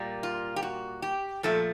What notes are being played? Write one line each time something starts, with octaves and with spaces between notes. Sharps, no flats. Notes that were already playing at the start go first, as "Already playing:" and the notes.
Already playing: A#2 G3 A#3
F4
G4
F#4
G4
A#2 F3 A3 A4